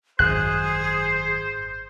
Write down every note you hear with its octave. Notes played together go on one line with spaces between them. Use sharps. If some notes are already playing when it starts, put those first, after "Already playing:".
G#1 F#2 G#4 C5 F#6